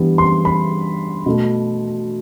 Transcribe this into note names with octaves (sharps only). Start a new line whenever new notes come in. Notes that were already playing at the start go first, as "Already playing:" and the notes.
Already playing: G2 E3 G3 B3
C6
B5
B2 A3